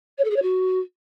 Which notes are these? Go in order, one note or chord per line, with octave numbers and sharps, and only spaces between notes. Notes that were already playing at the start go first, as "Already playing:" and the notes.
C#5
A4
G#4
C#5
F#4